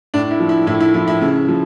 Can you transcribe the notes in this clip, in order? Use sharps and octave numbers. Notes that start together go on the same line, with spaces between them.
A2 D4
E4
F3
E4
A2 E4
E4
F3 E4
E4
C#3
F3